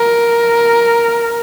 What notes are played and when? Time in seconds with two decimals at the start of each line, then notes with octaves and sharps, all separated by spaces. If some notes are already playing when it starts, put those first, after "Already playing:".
Already playing: A#4